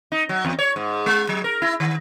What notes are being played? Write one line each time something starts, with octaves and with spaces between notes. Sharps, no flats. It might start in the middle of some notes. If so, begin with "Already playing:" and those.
D#4
F#3
E2
C#5
G#2
G#3
F#3
A#4
E4
D#3